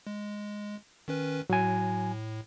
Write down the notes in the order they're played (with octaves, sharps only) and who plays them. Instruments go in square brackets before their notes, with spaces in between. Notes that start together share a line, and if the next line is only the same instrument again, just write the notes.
[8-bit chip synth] G#3
D#3 C#4 B4
[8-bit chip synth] A2 [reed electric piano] F#3 G#5